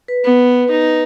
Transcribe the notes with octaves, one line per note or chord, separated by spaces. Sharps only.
B4
B3 B4
D#4